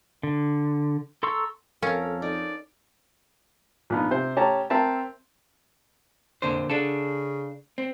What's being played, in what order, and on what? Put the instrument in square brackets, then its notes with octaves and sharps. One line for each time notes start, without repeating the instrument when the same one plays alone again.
[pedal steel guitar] D3
A4 A#5 C6 C#6 E6
[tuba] F2 [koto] C#4 [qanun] A4 A#4 F5
[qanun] D#4 [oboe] D5
[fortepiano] A#1 B3 D#4
C3 C5
A3 C#4 G4 A5 A#5
C4 A#4 E5 A5
[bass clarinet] F2 [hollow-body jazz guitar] A#2 D3 C5
[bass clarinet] C#3 [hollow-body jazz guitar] D4 A4
[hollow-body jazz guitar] C4